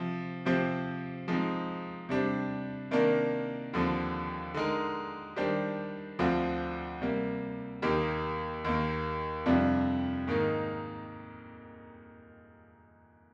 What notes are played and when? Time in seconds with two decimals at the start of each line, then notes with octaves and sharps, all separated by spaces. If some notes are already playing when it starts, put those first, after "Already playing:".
Already playing: C3 F3 C4
0.45 C3 F3 C4 G4 C5
1.28 F3 G#3 C4 D#4
2.09 C3 G3 D4 G4 C5
2.91 C3 D#3 A#3 D4
3.73 D#2 D3 F3 C4
4.54 D3 G#3 D#4 A#4
5.36 D#3 G3 D4 G4 C5
6.19 D2 D3 F3 C4 F4
7.01 C3 G3 A#3
7.82 D#2 D#3 A#3 D#4 G4
8.64 D#2 D#3 A#3
9.46 F2 C3 G3 D4 F4
10.28 G#2 D#3 A#3 D#4